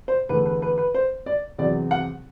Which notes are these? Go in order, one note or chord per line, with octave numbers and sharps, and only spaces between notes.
C5
E2 D3 A3 B4
B4
B4
B4
C5
D5
E2 C3 F#3 D5
F#5